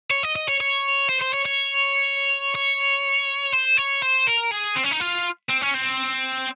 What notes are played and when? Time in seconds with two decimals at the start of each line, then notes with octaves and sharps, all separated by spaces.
0.11 C#5
0.23 D#5
0.36 D#5
0.48 C#5
0.61 C#5
1.09 C5
1.21 C5
1.33 C#5
1.45 C#5
2.55 C#5
3.53 C5
3.78 C#5
4.02 C5
4.27 A#4
4.51 G#4
4.76 C4
4.84 C#4
4.92 D#4
5.01 F4
5.49 C4
5.61 C#4
5.74 C4